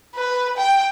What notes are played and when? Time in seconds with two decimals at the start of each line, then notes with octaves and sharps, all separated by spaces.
0.16 B4
0.57 G5